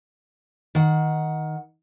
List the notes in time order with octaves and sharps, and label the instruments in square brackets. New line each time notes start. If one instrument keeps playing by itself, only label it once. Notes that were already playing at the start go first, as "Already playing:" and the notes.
[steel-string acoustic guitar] D#3 F#5